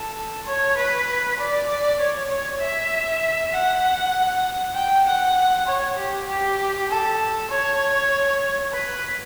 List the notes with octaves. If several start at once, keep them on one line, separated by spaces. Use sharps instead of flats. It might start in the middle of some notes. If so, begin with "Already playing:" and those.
Already playing: A4
C#5
B4
D5
D5
C#5
C#5
E5
F#5
G5
F#5
C#5
G4
G4
A4
C#5
B4